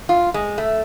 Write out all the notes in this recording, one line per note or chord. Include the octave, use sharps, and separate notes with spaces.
F4
G#3
A3